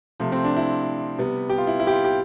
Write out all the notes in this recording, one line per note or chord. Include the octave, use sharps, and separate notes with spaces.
C3 F3 A3
C4
D4
E4
C3 G3 B3
G4
F4
E4
E4
G4
F4
G4